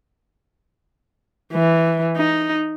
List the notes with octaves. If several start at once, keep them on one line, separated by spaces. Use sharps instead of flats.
E3
D#4